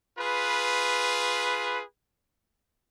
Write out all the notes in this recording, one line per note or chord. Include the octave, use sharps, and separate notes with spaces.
F4 G#4 B4